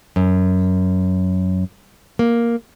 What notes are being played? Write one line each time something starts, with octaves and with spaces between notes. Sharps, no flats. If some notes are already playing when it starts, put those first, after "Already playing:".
F#2
A#3